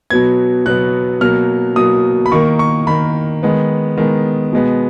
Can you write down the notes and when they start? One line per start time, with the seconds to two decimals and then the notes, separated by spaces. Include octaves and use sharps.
0.10 B2 F#3 B3 G#6
0.66 B2 F#3 B3 F#6
1.21 B2 F#3 A#3 F6
1.76 B2 F#3 A#3 D#6
2.26 B5
2.32 D#3 A#3 C#6
2.59 C#6
2.87 D#3 A#3 B5
3.43 D#3 G#3 B3
3.97 D#3 G#3 B3
4.53 B2 G#3 B3